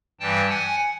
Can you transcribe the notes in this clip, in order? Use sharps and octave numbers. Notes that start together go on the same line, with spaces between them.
G2 E3 G3 G5 A5
F#5 G#5